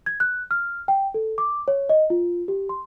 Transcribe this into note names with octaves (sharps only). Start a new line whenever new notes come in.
G#6
F#6
F6
G5
A4
D6
C#5
D#5
F4
G4
C6